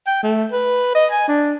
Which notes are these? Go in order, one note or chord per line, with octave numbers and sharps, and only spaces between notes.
G5
A3
B4
D#5
G#5
D4